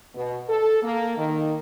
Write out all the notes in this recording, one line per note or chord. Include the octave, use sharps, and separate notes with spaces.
B2
A4
A#3
D#3